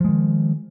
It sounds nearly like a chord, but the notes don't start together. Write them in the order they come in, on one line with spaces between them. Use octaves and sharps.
F3 G#3 D#3